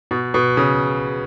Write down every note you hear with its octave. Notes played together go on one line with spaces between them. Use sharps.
B2
B2
C#3